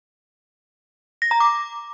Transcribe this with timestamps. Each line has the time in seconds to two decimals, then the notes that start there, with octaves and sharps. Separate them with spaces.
1.22 A#6
1.31 A#5
1.40 D6